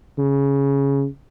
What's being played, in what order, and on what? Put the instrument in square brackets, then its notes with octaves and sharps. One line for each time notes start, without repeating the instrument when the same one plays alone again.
[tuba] C#3